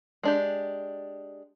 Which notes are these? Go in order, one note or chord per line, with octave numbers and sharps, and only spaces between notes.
G#3 D4 G4